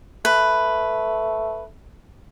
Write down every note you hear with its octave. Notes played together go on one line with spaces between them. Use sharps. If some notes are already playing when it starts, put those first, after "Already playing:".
A3 B4